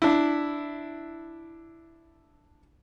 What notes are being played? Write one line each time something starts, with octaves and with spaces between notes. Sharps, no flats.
D4 E4